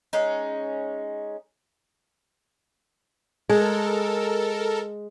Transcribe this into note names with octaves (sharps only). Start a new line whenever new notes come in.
G#3 C#4 D#4
G#3 A4 A#4